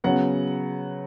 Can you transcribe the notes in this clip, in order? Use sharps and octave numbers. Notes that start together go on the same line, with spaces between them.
C#3 F#3 B3 F#5